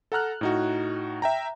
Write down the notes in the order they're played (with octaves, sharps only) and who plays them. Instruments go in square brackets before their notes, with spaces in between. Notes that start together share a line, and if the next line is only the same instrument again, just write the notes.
[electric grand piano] A4 F#5 A#5 F6 F#6
A2 D#4 F#4
E5 G5 A#5